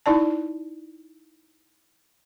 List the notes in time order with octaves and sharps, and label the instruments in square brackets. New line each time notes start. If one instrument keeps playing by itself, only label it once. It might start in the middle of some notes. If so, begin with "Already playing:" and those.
[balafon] D#4 E4 D5 A5